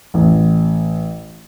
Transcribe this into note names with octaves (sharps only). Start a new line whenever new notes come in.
A1